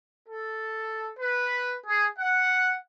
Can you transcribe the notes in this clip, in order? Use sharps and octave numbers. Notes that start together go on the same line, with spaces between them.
A4
B4
G#4
F#5